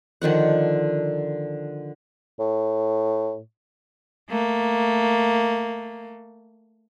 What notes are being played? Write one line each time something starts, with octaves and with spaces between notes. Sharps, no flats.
D3 D#3 F3 F#5
A2
A3 A#3